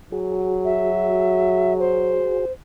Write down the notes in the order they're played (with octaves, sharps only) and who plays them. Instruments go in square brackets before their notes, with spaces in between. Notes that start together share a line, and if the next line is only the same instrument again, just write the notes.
[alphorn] F#3 [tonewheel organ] F#4 G#4
[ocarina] E5
C5